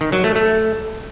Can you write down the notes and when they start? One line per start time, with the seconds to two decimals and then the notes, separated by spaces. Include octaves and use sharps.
0.01 D#3
0.12 F#3
0.24 A3
0.35 A3